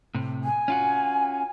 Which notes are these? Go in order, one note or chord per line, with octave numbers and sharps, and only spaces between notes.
A2 C3
G#5
C#4 F4 F#4